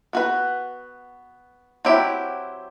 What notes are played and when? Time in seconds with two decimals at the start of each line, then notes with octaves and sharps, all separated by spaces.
0.13 B3 F#4 B4
1.85 F#3 C4 E4 G4